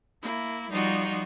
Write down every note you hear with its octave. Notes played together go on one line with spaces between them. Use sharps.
A#3 E4
F3 G3 D#4 F4 F#4